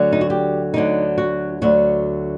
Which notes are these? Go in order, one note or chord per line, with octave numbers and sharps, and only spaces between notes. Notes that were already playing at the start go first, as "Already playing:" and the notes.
Already playing: D2 D3 F#3
D#4
F#4
G4
D2 D3 F#3 D#4
F#4
D2 D3 F#3 F#4